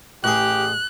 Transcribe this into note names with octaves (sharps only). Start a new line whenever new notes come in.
A1 G4 G#4 F#6